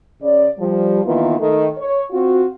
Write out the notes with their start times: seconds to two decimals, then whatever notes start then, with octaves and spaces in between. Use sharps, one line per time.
0.22 C#3 D5
0.58 F3 G3
1.04 D#3 E3 A#3 B3 F4
1.39 D#3 A3
1.77 C#5
2.11 C4 F4 F#4